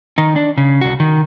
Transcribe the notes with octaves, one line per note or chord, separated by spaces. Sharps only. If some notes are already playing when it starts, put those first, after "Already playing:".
D#3 D#4
D4
C#3
C2 F#4
D#3